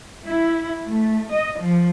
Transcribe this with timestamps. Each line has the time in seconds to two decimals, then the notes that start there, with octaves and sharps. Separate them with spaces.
0.25 E4
0.87 A3
1.32 D#5
1.61 F3